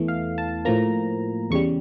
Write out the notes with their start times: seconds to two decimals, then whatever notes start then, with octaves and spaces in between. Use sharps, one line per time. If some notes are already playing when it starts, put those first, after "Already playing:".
Already playing: E2 E3 A3
0.08 F5
0.38 A5
0.65 A2 F3 A#3 A#5
1.51 E2 C#3 G3 C#6